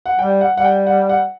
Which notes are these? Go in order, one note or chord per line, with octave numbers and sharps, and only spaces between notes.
F#5
G3 G5
F#5
G3 F#5
G5
F#5
F#5